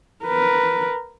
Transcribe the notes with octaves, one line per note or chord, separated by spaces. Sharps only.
A#4 B4